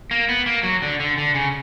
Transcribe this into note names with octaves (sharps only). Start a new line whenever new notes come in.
A#3
B3
A#3
F#3
D3
D3
D3
C#3